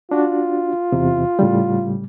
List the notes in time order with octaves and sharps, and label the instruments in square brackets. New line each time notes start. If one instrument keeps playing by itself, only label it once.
[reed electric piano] D4 F#4 [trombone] F4
[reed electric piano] E2 C3
A2 C#3 G3